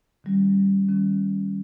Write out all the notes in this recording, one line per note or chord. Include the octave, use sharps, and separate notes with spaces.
D#3 G3 C#4
D#3 G3 C#4